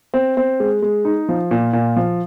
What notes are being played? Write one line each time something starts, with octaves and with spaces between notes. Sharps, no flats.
C4
C4
G#3
G#3
D#4
F3
A#2
A#2
F3